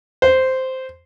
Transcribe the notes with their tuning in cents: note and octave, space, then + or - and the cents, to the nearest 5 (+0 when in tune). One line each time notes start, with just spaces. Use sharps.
C5 -5